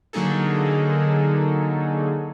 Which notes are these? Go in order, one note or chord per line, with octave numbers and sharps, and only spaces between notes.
D3 F#3 A#3 D#4 G#4 A4